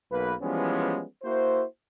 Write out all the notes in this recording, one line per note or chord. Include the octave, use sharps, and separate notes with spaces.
B1 A#3 B4
E3 F3 G3 G#3 B3 C#4
A#3 E4 F#4 C5